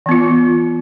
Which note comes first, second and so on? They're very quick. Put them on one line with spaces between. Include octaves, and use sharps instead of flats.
E3 B3 F4